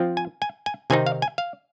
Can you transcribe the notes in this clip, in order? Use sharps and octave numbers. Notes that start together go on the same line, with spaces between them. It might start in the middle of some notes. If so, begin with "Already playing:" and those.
Already playing: F3 C4 F4
G#5
G#5
G#5
C3 D#3 C4 D#4 G#5
F5
G#5
F5